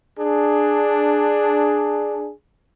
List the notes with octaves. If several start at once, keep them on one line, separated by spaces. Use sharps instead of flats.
D4 G#4